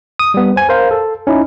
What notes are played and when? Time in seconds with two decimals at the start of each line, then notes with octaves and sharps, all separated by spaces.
0.19 D#6
0.34 G3 B3
0.56 C5 G#5
0.69 A#4 C5 F5
0.91 A4
1.27 C#4 D#4 E4